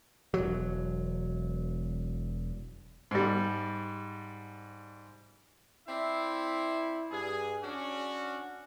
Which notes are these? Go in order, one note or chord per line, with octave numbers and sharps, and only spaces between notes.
E1 F#3
G#2 G3
C4 E4 D5 E5
G2 G#4
C#4 D4 F#4